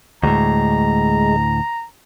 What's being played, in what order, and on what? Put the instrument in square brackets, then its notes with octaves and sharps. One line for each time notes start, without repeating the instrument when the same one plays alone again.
[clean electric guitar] D2 A2 [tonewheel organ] G#3 [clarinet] A#5